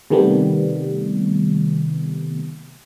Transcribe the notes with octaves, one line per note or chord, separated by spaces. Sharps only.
C3 D#3 G3 A3 B3